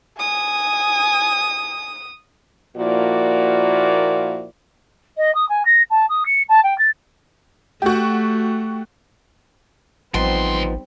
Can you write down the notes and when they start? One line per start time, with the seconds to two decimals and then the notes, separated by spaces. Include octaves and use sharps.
0.19 G#5 D#6
2.76 A#2 F3 A#3 E4 F#4 D5
5.17 D#5
5.34 D#6
5.49 G#5
5.65 A#6
5.90 A5
6.09 D#6
6.25 C#7
6.49 A5
6.63 G5
6.78 A6
7.82 A3 F#4 G4
10.14 A1 D2 F3 G3 B3 C4 D#4 C6